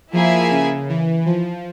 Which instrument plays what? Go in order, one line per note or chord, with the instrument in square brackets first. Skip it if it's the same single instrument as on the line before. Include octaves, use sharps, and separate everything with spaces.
[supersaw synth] F3 [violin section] A#3 E4 G#4 E5 G#5
[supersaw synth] C#3
E3
F3